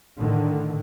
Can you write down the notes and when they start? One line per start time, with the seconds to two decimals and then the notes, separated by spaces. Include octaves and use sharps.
0.18 A2 D3 D#3